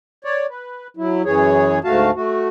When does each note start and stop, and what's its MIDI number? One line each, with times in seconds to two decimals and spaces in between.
0.25 0.46 73
0.25 0.46 74
0.50 0.87 71
0.97 1.22 54
0.97 1.22 64
1.25 1.79 42
1.25 1.79 52
1.25 1.79 68
1.25 1.79 73
1.84 2.11 38
1.84 2.11 44
1.84 2.11 57
1.84 2.11 66
1.84 2.11 77
1.84 2.11 81
2.15 2.49 57
2.15 2.49 66